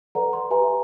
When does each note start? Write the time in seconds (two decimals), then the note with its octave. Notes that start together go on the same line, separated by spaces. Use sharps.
0.15 A4 B4 D5 F#5 A#5
0.33 C6
0.51 G4 B4 E5 G#5 A#5